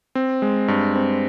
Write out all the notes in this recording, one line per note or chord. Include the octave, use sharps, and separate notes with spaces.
C4
G#3
G2
C4